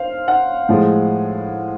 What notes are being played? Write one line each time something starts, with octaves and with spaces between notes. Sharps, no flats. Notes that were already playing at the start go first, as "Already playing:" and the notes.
Already playing: C5 F5
F#5
A2 F3 G#3